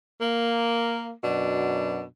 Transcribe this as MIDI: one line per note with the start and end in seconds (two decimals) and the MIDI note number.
0.21 1.10 58
1.24 2.02 42
1.24 2.02 47
1.24 2.02 62